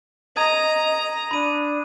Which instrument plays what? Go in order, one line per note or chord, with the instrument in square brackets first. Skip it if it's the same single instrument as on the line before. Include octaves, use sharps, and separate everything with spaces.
[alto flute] D#5 [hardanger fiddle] A#5 [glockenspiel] D#6 G#6 D#7
[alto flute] D4 [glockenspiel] B5 D#7